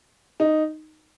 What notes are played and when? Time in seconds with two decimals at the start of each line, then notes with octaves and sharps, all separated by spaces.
0.40 D#4